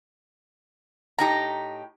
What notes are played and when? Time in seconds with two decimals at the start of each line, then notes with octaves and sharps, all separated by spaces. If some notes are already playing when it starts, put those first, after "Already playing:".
1.19 A2 D#4 G4 A#5